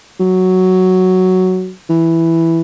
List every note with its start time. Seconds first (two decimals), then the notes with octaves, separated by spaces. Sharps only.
0.20 F#3
1.89 E3